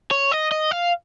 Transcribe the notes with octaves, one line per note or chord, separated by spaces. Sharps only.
C#5
D#5
D#5
F5